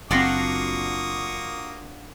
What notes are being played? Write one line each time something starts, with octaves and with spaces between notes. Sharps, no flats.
F#1 A#3 C4 D4 F4 F#4 C#6 D#6